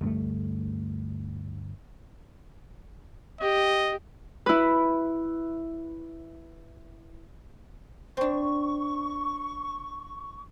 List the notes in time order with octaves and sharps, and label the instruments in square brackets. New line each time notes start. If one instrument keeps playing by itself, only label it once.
[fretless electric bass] D2 G2 A3
[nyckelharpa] G4 [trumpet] D#5
[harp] E4 B4
[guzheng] C4 D4 [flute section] C#6